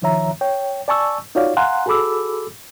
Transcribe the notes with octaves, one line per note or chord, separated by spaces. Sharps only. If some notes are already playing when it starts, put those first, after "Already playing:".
C2 D#3 F3 C#5 E5 A#5
C#5 G5
D5 G#5 A5 C#6 E6
D#4 F4 F#4 C#5 D5 F5
F5 F#5 G#5 A#5 C6 F#6
F#4 G#4 A4 B5 D6 E6